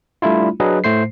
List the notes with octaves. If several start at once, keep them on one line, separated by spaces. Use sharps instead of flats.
G3 A3 D4 E4 F4
F#3 D4 G#4 B4 D#5
A2 A3 C5 C7